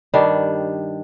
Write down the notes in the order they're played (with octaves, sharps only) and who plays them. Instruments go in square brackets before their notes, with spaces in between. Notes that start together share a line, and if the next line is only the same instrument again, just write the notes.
[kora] G2 D#3 G3 D4